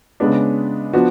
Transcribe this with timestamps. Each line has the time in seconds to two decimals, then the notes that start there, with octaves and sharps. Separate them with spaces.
0.20 C#3 G#3 B3 D4
0.93 F3 B3 D4 F#4